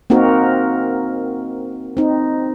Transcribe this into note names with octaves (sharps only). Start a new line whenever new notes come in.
A#3 C4 D#4 F#4 A#4
C4 D#4